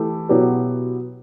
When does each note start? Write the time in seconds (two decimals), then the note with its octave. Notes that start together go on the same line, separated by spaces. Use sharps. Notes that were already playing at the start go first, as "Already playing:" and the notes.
Already playing: E3 A3 E4 G4
0.29 B2 F#3 B3 E4 G4